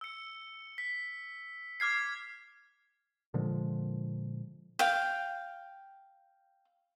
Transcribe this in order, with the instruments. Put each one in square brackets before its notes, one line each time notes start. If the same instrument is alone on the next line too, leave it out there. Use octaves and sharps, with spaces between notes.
[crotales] E6 C#7
B6
D6 F6 G#6 C7
[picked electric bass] A#2 D3 F3 G#3
[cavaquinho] F5 G5